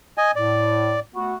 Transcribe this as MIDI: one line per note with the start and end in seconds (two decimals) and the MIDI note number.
0.18 0.31 75
0.18 0.31 80
0.36 0.97 45
0.36 1.00 74
1.15 1.34 57
1.15 1.34 59
1.15 1.34 66